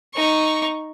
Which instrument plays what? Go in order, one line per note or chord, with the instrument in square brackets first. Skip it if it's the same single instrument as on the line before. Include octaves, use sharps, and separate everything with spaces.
[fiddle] D#4 C#6